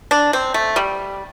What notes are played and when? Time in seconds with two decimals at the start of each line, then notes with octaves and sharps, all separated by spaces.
0.11 D4
0.33 C4
0.54 A3
0.76 G3